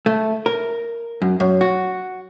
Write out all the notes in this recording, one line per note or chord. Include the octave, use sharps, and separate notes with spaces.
A3
A#4
F#2
F#2
F#4